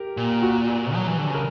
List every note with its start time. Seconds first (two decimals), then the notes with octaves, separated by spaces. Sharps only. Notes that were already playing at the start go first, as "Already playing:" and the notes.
Already playing: G4 A#4
0.17 A#2
0.43 F#4
0.95 F#3
1.07 E3
1.18 D3
1.30 C#3 A#4